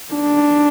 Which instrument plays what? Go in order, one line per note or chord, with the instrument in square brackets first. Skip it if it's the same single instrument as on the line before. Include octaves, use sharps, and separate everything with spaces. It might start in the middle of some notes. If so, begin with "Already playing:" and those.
[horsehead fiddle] D4